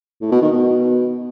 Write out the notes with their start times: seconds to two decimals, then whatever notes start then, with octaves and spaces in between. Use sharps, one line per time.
0.21 A2
0.32 B2
0.42 D#3
0.52 B2